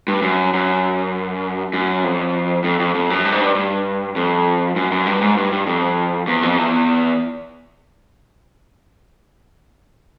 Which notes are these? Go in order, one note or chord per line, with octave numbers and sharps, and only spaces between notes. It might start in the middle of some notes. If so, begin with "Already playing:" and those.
G2
F#2
F#2
F#2
F2
F2
F2
F2
F#2
G2
G#2
G2
G2
F2
F#2
F#2
G2
G#2
G2
G2
F2
E2
F2
E2